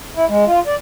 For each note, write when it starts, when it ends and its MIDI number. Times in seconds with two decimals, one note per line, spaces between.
0.16 0.25 64
0.28 0.45 56
0.47 0.60 65
0.67 0.75 74